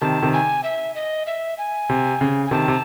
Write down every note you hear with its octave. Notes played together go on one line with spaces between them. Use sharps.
C3 D#3 A5
C3 D#3
G#5
E5
D#5
E5
G#5
C3
C#3
G#5
C3 D#3 A5
C3